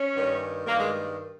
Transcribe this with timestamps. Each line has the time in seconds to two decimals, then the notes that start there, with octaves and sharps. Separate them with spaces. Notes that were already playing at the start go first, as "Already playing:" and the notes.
Already playing: C#4
0.15 G2 D#3
0.66 G2 D#3 A#3
0.79 G#3